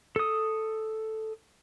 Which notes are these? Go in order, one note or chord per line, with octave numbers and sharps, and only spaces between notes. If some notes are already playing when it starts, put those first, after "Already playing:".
A4 D#6